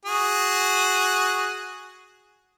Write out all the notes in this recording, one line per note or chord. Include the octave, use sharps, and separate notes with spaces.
F#4 G#4